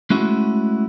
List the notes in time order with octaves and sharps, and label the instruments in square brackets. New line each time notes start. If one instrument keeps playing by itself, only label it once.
[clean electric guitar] G#3 A3 C#4 E4 F#4